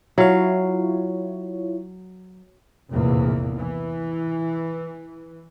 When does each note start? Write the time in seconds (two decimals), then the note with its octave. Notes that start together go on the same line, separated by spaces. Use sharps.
0.18 F#3 E4 F4 C#5 F5
2.91 F1 A#1 E2 A2 A#3
3.58 E3